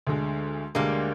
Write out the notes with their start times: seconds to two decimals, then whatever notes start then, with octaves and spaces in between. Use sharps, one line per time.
0.07 D2 D3 G#3
0.75 D2 D3 G3 G#3 A#3